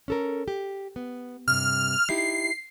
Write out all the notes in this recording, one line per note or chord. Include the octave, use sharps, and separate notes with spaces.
C#4 A4 A#4
G4
B3
G2 C3 F6
D#4 E4 G4 C7